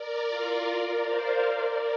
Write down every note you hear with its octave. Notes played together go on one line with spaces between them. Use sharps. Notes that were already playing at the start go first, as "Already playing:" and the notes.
Already playing: A#4 D5
F4 A#4
A#4 D5
C5 F5
A#4 D5